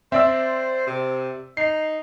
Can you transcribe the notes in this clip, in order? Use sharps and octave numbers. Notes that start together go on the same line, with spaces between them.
C4 C5 D5 E5 E6
C3
D#4 C7